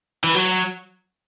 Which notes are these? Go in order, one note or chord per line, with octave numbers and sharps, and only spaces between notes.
E3
F#3